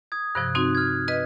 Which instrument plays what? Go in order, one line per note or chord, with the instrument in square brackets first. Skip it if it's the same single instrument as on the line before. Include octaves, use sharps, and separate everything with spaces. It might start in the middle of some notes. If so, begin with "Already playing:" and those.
[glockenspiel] D#6 G#6
[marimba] G2 C3 F3 [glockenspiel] F#6
[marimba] C4 D#4 F#4
[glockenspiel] F6 G#6
[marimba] B4 D#5